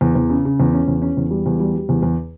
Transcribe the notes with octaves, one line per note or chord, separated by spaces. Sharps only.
E2
E2
C#3
C#3
E2
C#4
E2
C#4
E2
G3
E2
G3
G3
E2
E2